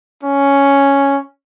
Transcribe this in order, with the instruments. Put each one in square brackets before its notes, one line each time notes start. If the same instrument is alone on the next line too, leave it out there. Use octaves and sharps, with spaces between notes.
[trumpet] C#4